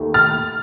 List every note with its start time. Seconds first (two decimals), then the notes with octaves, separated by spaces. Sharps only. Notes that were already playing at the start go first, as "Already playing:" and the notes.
Already playing: D#2 D#3 A3
0.14 F6 A6